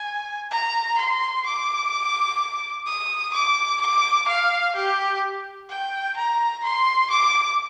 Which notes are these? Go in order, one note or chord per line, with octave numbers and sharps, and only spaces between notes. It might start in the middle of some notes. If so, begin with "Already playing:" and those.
Already playing: G#5
A#5
C6
D6
D#6
D6
D6
F5
G4
G5
A#5
C6
D6